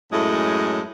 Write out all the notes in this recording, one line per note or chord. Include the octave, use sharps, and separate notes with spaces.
F#2 A2 G#3 A3